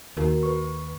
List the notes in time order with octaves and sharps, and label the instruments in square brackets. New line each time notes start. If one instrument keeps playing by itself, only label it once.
[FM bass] D#2 [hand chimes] F#4 A#4
[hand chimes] B4 C#6